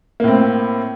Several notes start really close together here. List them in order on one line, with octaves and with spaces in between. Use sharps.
A#3 A2 C4